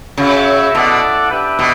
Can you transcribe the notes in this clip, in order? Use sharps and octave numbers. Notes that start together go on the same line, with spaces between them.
C#3 F#4 C#5 E5 G5
B2 E4 A4 D5 F#5
D4 G4 B4 E5 G5
B2